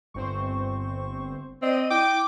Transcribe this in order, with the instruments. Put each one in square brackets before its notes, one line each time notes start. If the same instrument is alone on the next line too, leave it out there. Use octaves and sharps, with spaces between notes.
[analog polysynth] G1 C4 C5 [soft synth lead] C#6
[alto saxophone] C4 [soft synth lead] D5 [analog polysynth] D#5 D#7
[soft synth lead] E4 [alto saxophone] G5 [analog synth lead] D6